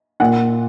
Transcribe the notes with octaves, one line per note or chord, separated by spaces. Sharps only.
A#2 F#5